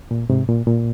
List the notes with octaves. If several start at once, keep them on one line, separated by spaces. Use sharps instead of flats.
A#2
G#2 C3
A#2
A#2